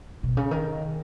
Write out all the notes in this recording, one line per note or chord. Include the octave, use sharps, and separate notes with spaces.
B2
C#3
D#3